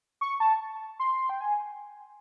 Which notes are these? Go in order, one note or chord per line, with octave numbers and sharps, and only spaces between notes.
C#6
A5
C6
G5
G#5